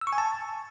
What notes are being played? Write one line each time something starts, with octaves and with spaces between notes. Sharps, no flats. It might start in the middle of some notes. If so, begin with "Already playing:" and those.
E6
C#6
G#5
A5